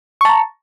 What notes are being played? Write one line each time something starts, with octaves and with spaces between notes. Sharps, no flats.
A5 A#5 C#6